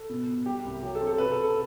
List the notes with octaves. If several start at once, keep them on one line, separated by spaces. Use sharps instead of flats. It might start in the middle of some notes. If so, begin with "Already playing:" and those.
Already playing: A4
B2
B2
G3 G4
C2
F#3 G4
A4
C4
A4
C3 B4
A4
C3
A4